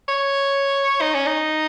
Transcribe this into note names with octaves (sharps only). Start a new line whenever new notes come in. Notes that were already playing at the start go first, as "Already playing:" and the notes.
C#5
D#4
C#4
D#4